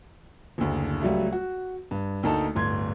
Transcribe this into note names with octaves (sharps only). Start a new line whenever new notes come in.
F#1 D2
C#2 F#3 G3 A3
F#4
G2
D2 A#3 D#4 A4 A5
D1 G1 C6 G#6